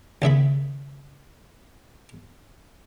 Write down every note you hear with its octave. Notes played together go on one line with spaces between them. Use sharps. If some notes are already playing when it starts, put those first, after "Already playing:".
D#2 C#3 E5 B5